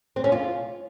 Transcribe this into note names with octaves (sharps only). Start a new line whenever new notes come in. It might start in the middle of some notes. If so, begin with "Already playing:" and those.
C4
C#4
F4